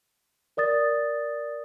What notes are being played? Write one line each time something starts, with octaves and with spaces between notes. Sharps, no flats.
A#4 D5 D#6 A6